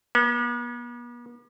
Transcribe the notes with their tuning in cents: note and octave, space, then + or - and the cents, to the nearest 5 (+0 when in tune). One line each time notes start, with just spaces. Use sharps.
B3 -45